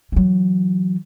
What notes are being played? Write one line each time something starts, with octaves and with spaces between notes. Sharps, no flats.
E3 F#3